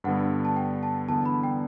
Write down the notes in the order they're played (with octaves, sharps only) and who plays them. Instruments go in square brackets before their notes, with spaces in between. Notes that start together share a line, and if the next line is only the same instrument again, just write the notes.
[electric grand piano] G2 D3 G3 B3 [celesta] F#5
[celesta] A5
G5
A5
[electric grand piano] E2 D3 G3 B3 [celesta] A5
[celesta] B5
G5